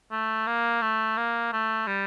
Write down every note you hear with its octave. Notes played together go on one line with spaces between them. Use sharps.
A3
A#3
A3
A#3
A3
G3